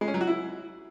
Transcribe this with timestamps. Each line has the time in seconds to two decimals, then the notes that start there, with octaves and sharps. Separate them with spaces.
0.01 G#3
0.08 C#4
0.14 F#3
0.21 F#4
0.27 E4